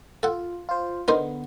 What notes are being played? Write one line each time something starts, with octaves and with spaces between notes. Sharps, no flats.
F4 A4 F#5
F4 C5
D3 B3 D#4 A#4 C5